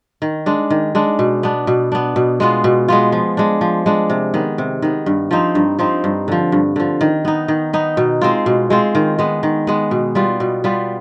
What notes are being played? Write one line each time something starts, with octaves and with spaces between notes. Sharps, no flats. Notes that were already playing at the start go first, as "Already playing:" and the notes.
D#3
G#3 D4
D#3
G#3 D4
B2
B3 D4
B2
B3 D4
B2
G#3 B3 F4
B2
G#3 B3 F4
F3
G#3 D4
F3
G#3 D4
C3
D#3 B3
C3
D#3 B3
G2
F3 C4 D#4
G2
F3 C4 D#4
G2
D3 F3
G2
D3 F3
D#3
B3 D#4
D#3
B3 D#4
B2
G#3 C4 F4
B2
G#3 C4 F4
D#3
G#3 B3
D#3
G#3 B3
B2
G3 B3 F4
B2
G3 B3 F4